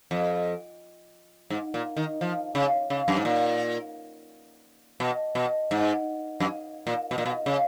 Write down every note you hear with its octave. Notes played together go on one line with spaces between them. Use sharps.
F2
G#2
A#2
D#3
F3
C#3
C#3
F#2
G#2
A#2
B2
B2
G#2
F#2
A#2
B2
A#2
B2
C#3